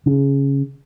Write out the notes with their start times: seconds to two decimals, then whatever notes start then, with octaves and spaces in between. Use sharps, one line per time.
0.06 C#3